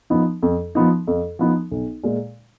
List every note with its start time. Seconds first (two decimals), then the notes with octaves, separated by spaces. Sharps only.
0.10 F3 B3 D#4
0.42 F2
0.75 F3 B3 D#4
1.07 F2
1.39 F3 B3 D#4
1.71 B1
2.04 A#2 G#3